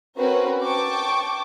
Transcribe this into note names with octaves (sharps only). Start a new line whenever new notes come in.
C4 C#4 F#4 A#4 B4 C#5
G5 A5 C#6 D6